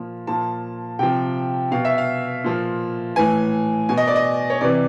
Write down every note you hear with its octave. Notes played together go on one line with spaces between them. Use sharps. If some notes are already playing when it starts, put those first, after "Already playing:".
Already playing: A#2 F3
A#2 F3 A5
C3 F3 G5
B2 F5
E5
F5
A#2 F3
A2 E3 G#5
B2 G#5
D#5
D5
D#5
C#5
C3 E3 D5